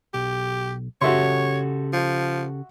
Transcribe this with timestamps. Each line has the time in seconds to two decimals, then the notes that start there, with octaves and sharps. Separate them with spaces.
0.14 B1 G4
1.02 C#3 F#4 G4 A4 C#5 E5 C6
1.93 F3